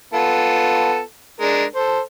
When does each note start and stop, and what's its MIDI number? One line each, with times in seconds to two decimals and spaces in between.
0.14 1.00 59
0.14 1.00 65
0.14 1.00 69
1.41 1.64 56
1.41 1.64 62
1.41 1.64 70
1.75 2.00 69
1.75 2.00 72